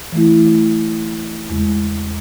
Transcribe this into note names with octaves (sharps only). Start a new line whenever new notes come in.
E3 A3 E4
E2 C#3 G#3